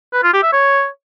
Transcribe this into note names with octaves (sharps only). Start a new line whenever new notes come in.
B4
F4
G4
E5
C#5